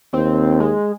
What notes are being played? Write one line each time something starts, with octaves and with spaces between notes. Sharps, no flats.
D#2 C4
G#3